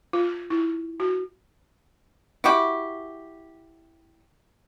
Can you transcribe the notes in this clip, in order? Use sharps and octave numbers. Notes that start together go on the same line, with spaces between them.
F4
E4
F#4
E4 F#4 G4